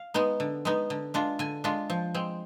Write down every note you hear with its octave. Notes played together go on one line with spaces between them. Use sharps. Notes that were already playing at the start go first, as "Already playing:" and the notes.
Already playing: F5
G#3 B3 D#4
D3
G#3 B3 D#4
D3
G#3 D4 F4
D3 G#5
G#3 D4 F4
F3
G#3 C4